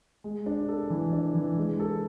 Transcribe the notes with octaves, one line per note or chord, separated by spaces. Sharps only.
G#3
D4
A4
E3
D4
E3
G#3
A4